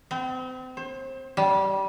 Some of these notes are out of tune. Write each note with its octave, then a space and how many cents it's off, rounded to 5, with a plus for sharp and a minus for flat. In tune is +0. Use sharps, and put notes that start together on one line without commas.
C4 -35
C5 +30
G3 -20